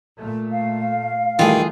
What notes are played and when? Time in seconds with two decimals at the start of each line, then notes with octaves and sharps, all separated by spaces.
0.21 A#2 A3
0.51 F5
1.39 D#3 E3 G3 A3 F4 G#4